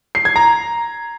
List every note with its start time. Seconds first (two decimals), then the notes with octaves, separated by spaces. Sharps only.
0.15 C7
0.25 G#6
0.36 A#5